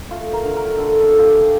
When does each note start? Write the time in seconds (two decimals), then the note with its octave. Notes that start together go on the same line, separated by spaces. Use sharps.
0.11 A3 F4
0.33 A#4
0.44 D3
0.56 A#4
0.78 D3 A4
1.00 A4
1.12 F3
1.19 F4 G4